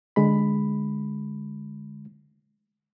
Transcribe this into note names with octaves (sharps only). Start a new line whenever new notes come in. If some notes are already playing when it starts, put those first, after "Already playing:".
D3 G#3 B5